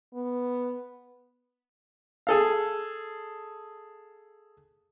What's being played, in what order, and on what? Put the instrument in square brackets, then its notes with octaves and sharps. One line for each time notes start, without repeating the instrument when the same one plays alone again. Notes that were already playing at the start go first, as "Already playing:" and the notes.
[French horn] B3
[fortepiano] G#4 A4 F5